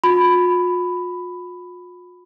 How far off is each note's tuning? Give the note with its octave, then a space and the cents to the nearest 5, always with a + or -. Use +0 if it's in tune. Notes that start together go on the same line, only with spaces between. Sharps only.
F4 +45 B5 +10